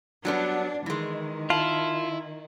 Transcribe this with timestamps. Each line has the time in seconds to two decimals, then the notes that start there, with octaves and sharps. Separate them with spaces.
0.25 F#3 G3 B3 D4
0.86 D#3 E3 G#3
1.50 E4 F4 A5